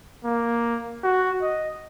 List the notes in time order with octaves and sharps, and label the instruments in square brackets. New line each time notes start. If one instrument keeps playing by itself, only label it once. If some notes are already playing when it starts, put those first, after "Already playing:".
[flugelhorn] A#3
F#4
D#5